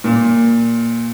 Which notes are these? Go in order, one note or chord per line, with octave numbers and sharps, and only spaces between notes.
A#2